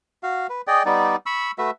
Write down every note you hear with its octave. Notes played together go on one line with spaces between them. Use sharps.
F#4 F5
B4
G#4 D5 D#5 G5
G3 B3 D#4 D5
B5 C#6 E6
A3 F#4 B4 E5